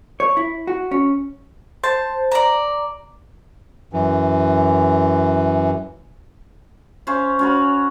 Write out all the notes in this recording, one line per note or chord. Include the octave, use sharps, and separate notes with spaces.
C#5
E4
F#4
C#4
C5 A5
D5 A#5
F#2 E3
C#4 C5 F5
C#4 F#4 B5